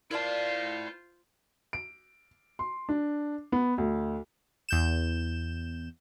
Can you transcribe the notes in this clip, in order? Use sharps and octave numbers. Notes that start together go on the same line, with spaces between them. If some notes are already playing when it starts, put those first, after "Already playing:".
E4 F4 A#4 C5 D5 F5 A5
D7
C6
D4
B3
D2
E2 G6 E7